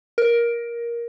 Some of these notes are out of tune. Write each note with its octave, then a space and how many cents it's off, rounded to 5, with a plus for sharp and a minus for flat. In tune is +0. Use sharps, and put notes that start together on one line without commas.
A#4 +15